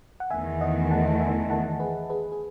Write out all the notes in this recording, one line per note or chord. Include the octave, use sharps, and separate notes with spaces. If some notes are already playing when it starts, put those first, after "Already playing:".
F#5
E2 D#3 A3 E5 G#5
D#5 F#5
F#5 A5
E5 G#5
F#5 A5
G#4 B4
G#4 B4
G#4